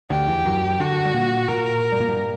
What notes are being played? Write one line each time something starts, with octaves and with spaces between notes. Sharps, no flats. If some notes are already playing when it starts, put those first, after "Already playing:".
D2 D3 G4
E2 E3
F#2 F#3
D3 D4 F#4
G3
A#2 A#3
A#2 A#3 A#4
G2 G3
A#2 A#3
G2 G3